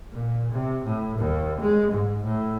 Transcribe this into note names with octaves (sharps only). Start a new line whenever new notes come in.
A#2
C3
A2
D#2
G#3
G#2
A2